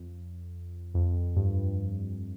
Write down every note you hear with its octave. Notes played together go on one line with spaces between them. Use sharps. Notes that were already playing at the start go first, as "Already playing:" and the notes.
Already playing: F2
F2
G2